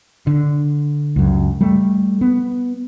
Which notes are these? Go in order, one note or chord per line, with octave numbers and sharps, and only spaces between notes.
D3
C#2 F#2
G3 A3
B3